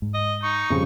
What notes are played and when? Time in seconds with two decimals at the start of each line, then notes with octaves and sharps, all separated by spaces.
0.02 G#2
0.14 D#5
0.43 D#4 C#6
0.70 F2 C#3 G3